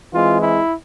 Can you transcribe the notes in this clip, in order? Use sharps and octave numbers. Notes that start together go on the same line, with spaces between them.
E3 G#3 C4 F4
E4